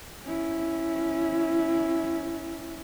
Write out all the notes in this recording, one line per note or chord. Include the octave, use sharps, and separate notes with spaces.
C#4 E4